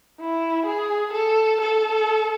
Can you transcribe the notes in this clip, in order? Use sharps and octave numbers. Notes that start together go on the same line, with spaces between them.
E4
G#4
A4
A4